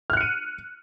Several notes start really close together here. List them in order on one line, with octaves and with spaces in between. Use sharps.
F6 F#6 C#7 D#7